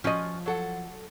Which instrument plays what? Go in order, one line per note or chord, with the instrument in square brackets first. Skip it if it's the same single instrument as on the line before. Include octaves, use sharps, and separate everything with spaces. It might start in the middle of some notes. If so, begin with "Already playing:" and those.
[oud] F3 D#5 [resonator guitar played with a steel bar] C#4 F4 F#4
[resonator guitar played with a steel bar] F#3 A4 F#5